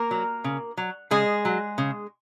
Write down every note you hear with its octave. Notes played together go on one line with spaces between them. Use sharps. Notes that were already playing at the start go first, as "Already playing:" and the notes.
Already playing: A#3 A#4
F#3
C#3
F#3
C#3 G#3 G#4
F#3
C#3